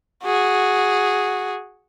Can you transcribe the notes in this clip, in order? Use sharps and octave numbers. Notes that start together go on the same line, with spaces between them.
F#4 G#4